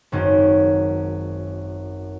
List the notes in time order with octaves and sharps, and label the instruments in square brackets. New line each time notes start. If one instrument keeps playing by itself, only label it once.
[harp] G#1 F#2 D#3